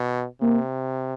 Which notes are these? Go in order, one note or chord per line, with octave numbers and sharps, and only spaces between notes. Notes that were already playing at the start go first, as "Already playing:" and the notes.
Already playing: B2
C3 A#3